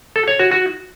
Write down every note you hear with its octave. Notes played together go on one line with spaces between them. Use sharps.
A4
C#5
F#4
F#4